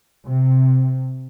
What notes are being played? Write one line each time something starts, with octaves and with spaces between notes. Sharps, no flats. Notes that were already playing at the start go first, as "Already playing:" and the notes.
C3